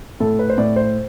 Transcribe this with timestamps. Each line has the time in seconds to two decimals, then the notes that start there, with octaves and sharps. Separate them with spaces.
0.20 A2 A4
0.39 B4
0.49 C5
0.58 A2 D5
0.76 C5